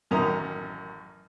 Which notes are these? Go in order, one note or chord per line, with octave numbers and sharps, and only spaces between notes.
A1 F#2 D#3 A#5 D#6